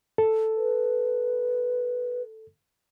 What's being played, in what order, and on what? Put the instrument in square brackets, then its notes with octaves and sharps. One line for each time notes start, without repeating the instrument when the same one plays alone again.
[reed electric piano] A4
[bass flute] B4